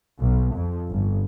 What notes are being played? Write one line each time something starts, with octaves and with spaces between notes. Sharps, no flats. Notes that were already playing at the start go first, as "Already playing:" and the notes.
B1
F2
G1